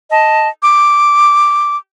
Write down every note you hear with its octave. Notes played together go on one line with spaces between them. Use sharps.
D#5 A5
D6